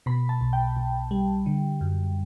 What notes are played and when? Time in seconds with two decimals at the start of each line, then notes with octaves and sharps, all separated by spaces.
0.06 B2 B5
0.29 A5
0.41 B1
0.53 G5
0.77 B1
1.11 G3
1.46 D3
1.81 F#2